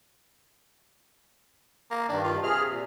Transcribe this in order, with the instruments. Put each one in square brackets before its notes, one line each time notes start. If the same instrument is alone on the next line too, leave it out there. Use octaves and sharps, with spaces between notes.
[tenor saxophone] A#3
[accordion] G2 D#3 [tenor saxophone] D4
[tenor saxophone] F4
[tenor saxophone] C3 [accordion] G#4 F6
[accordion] A#2